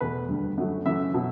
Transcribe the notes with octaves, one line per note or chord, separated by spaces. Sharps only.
E2 B2 A3 B4
D2 D3 G3
F#2 D3 F#3 A3
F#2 C#3 E3 A3 E5
B2 F#3